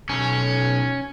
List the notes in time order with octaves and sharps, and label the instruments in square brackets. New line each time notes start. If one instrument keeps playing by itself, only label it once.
[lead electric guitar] B1 [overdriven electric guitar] C#4